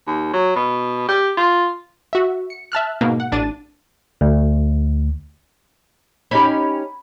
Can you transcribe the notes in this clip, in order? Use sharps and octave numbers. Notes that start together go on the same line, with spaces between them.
D#2
F#3
B2
G4
F4
F#4 E5
C#7
E5 A5 F6 F#6
G#2 B2 A#3
F#5
A1 D4 A6 D#7
D2
C#4 D#4 G4 B5